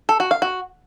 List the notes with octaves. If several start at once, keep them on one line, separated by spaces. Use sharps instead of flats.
A4
F#4
F5
F#4